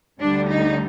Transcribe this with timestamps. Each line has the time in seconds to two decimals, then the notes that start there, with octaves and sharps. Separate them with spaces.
0.20 D2 D3 G3 D4
0.49 D#4